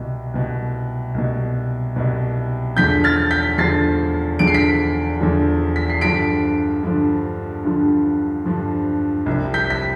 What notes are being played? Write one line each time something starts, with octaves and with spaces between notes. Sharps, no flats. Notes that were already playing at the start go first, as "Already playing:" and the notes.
Already playing: C2 B2
C2 B2
C2 B2
C2 B2
E2 D3 F3 G6 B6
F6 A6
G6 B6
E2 D3 F3 A6 C7
E2 D3 F3 D7
C7
B6 D7
E2 D3 F3
B6
C7
G2 D3 F3 B6 D7
G2 D3 F3
G2 D3 F3
G2 D3 F3
C2 C3 F3
G6 B6
B6